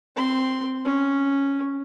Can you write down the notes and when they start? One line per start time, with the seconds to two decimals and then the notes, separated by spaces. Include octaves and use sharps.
0.16 C4 C6
0.85 C#4